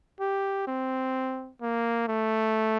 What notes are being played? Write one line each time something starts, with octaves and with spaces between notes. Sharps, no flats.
G4
C4
A#3
A3